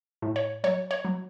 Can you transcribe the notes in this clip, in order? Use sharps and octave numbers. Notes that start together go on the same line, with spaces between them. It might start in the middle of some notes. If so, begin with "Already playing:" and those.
A2
C#5
F#3 C#5
C#5
F#3